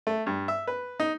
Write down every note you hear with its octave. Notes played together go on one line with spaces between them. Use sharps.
A3
G2
E5
B4
D#4